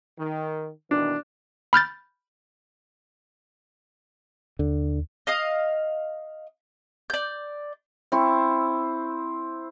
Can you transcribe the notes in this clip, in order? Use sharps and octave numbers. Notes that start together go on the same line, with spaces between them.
D#3
B2 D#3 E3 D4
B5 F6 G6 A6
D#2 D3
D#5 F5 D#6
D5 G6
C4 E4 C#6